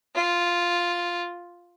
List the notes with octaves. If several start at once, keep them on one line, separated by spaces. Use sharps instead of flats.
F4